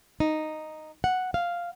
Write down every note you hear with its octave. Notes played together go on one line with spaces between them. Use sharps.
D#4
F#5
F5